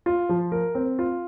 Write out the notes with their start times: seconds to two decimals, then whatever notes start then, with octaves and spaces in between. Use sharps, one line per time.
0.06 F4
0.29 F3
0.52 A#4
0.75 C4
0.99 F4